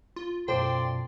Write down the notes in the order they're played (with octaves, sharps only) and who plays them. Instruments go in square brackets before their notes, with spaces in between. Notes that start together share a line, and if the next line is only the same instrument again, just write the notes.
[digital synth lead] F4
[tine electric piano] F#2 B2 [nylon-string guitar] F4 A4 C5 [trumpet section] D5 C6 [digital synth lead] G5